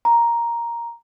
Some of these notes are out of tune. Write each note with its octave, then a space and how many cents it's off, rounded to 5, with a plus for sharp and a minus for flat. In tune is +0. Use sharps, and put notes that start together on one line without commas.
A#5 +5